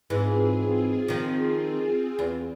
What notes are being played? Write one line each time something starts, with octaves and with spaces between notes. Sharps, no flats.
G#2 E3 C4 F4 G#4
D#3 F3
E2